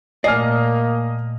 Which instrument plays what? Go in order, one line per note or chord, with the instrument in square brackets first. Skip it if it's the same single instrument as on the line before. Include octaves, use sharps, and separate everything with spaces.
[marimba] A#2 A3 [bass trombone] A#3 [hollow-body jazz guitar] D5 G#5 [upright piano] D#5 F6